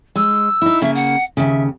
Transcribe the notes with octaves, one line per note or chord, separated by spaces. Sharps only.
G#3 E6
D#4 E4
C#3 A#3 E5
F#5
D#2 C#3 E5